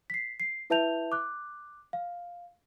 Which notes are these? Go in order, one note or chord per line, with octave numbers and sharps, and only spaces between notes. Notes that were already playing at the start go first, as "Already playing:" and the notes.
B6 C7
C7
E4 B4 E5 A5 G6 F7
D6 F#6
F5